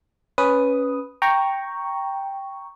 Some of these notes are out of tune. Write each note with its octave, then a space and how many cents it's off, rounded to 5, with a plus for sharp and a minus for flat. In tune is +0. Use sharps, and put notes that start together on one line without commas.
C#4 +0 B4 +0 D#6 +0
G5 +0 A#5 +0 C#6 +0